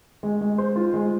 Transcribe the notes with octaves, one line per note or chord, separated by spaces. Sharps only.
G#3
G#3
C5
F4
G#3